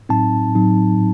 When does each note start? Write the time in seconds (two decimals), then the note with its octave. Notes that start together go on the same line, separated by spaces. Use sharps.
0.09 A2 F#3 C4 D#4 A5
0.55 A2 F#3 C4 D#4